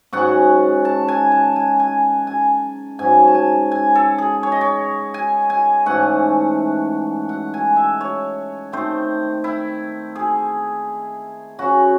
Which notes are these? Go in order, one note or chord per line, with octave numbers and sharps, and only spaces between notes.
G#2 D#3 F#3 C#4 F#5
A5
G#5
A5
G#5
G#5
G#5
G#2 F#3 C#4 G#5
A5
G#5
G#5
A4
G#4
C#5
D#5
C#5
G#5
G#5
G#2 E3 A3 C#4 F#5
F#5
G#5
E5
C#5
D#3 A3 C4 C5
E4
G#4
C#3 F#3 C#4 F#4